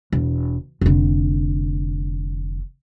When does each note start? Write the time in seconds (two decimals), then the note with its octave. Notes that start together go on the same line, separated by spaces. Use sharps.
0.12 E1
0.81 F1 D3